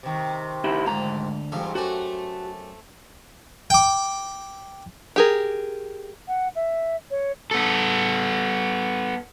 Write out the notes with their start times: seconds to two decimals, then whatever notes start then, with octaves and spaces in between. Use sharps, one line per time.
0.03 C3 D#3
0.64 D#4 E4 G4
0.86 D2 G#2 F3 A#5
1.52 E2 G#2 G3 F4 A4
1.75 F#2 A3 F#4 G4 G#5
3.70 G5 D6
5.16 G4 G#4 A#4
6.28 F#5
6.55 E5
7.11 C#5
7.51 B3 A4